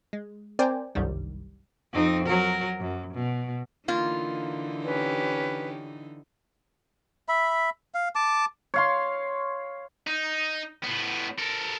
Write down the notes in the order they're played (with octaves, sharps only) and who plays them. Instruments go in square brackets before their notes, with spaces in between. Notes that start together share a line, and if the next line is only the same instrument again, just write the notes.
[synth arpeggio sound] G#3
C4 A#4 C5 D5 G5 G#5
G1 C2 F#2 D#3 G3
[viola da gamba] F2 C4 D#4
F#3 A#4
F#2
B2
[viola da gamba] D3 E3 D#4 [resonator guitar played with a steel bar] A#3 F4
[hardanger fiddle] C#4 G4 [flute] B4
[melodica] E5 B5
F5
A5 D6
[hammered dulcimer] C#5 F5 C6
[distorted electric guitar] D#4
A2 B3
A4 A#4